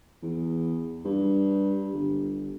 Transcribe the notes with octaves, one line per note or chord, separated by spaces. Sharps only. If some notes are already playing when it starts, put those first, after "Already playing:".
E2
G2
G1